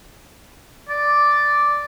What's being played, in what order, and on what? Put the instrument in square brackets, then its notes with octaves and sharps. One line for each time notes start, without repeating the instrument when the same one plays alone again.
[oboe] D5